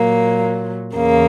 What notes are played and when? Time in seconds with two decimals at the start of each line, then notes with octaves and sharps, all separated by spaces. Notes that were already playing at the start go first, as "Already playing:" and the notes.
Already playing: A#2 F#3 A#3
0.97 E2 C#3 A#3